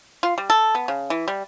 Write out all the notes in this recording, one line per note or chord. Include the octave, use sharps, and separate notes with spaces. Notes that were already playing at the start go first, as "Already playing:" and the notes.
F4
G3
A4
B3
C#3
E3
G3